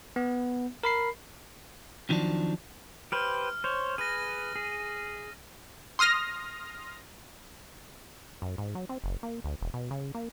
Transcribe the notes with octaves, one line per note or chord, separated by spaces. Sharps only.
B3
A#4 B5 C7
F2 D#3 F3 F#3 D4
G4 B4 C5 F6
C5 C#5
G#4 B4 A#6 D#7
G#4
C6 D#6 F6 A#6
F#2
G#2
F#3
C4
F#1
A#3
D2
E1
B2
C#3
A#3